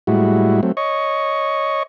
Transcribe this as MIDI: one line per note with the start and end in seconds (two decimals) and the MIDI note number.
0.07 0.61 45
0.07 0.61 55
0.07 0.61 56
0.07 0.61 64
0.07 0.61 66
0.63 0.72 54
0.63 0.72 57
0.63 0.72 60
0.77 1.83 73
0.77 1.83 75
0.77 1.83 85